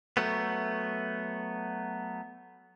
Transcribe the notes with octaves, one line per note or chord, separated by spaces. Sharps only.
F#3 A3 B3